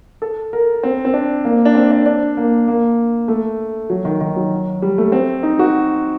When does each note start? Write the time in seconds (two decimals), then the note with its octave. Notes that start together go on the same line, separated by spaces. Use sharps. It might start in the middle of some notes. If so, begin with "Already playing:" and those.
0.22 A4
0.53 A#4
0.83 C4
1.05 C4
1.14 D4
1.45 A#3
1.65 D4
1.75 C4
1.91 D4
2.06 D4
2.37 A#3
2.68 A#3
3.28 A3
3.90 F#3
4.05 D#3
4.21 D#3
4.36 F#3
4.82 G3
4.98 A3
5.12 C4
5.43 D#4
5.59 F#4